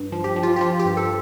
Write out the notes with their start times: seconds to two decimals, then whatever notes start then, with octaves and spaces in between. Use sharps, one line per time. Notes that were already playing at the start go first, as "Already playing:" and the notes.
Already playing: G2
0.12 F3
0.24 G4
0.36 F3
0.43 F4
0.56 G4
0.61 F3 F4
0.79 G4
0.85 G2
0.97 A4